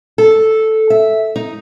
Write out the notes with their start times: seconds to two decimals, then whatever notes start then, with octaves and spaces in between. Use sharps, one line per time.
0.18 A4
0.90 E5
1.36 D#4